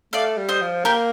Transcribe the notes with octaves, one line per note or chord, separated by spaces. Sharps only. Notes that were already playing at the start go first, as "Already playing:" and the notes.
A3 D5 F5
G3
C5 D#5
F3
A#3 G4 A#4